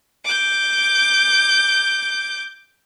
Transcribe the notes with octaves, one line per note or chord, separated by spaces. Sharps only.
D6 G6